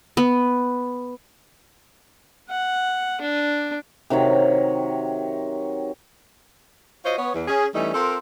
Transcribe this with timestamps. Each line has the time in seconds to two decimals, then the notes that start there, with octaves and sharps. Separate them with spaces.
0.17 B3
2.49 F#5
3.21 D4
4.10 C3 D#3 F#3 C#5
7.05 F4 F#4 C5 C#5 D#5
7.18 B3 C#5
7.34 E2
7.48 C#4 G#4
7.74 E3 G3 A3 C#4 D#4
7.94 C4 F4 A4 A#4